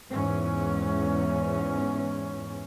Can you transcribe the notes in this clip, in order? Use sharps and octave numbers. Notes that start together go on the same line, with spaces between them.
E2 G#2 C#4